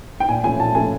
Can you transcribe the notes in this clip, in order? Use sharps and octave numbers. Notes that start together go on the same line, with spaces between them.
G5
A#2 G#5
F3 A3 C#4 G#5
A#2 A5
F3 A3 C#4 G#5